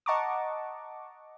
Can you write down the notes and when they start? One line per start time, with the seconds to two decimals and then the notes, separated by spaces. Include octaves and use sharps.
0.06 D#5 F#5 A5 A#5 C#6 D6